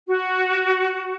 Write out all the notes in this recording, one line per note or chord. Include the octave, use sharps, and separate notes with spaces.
F#4